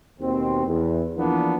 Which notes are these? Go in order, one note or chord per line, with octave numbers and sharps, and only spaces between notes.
D#2 B2 C4
E2
E3 F3 A#3 B3 D4